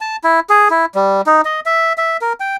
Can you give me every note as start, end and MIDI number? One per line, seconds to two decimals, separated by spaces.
0.01 0.16 81
0.24 0.40 64
0.50 0.68 68
0.70 0.85 64
0.95 1.21 55
1.26 1.41 63
1.45 1.60 75
1.66 1.93 76
1.98 2.17 76
2.21 2.33 70
2.40 2.56 79